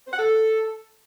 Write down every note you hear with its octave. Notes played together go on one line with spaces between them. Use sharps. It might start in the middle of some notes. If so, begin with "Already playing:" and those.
C5
F#5
A4